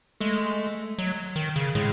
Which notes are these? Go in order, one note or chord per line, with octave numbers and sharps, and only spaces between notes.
G#3 A3
F#3
D#3
C#3
A2 G#3